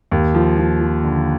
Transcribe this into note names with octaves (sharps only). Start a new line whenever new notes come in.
D#2
F3
F3
F3
D3